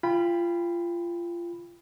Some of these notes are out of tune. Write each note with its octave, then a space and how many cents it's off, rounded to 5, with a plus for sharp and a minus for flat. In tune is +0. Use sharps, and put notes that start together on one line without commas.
F4 -25 G5 +20 B5 +0